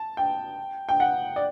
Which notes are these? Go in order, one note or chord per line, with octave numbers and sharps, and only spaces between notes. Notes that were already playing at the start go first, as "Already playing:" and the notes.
Already playing: A5
G5
G5
F#5
D5